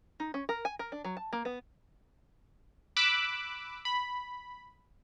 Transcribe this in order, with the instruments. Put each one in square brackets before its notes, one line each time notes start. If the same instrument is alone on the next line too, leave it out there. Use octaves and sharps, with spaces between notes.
[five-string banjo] D#4
C#4
A#4
G#5
A#4
D4
F#3
A5
A#3
B3
[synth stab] B5 D6 E6 F#6
B5